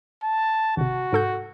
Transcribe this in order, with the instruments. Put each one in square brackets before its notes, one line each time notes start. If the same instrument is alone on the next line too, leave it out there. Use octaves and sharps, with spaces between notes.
[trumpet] A5
[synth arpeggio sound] G#1 C3 [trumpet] F#4
[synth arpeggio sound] G#2 A4 G6